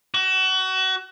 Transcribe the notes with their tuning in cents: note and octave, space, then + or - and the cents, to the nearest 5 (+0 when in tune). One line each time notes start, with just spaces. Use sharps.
F#4 +30